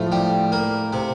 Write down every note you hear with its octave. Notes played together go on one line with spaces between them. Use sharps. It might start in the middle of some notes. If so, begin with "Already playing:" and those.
Already playing: A2 F3 A3
G3
A#3
C3